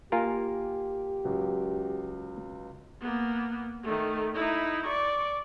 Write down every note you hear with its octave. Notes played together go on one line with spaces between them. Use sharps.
A#3 F4 G4 A#4 G#5
C#2 F#3
A#3 B3
D#3 A3
D#4 E4
D5 C#6